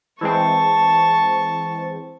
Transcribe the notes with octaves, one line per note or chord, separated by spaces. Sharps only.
E3 G#3 C4 A5 C#6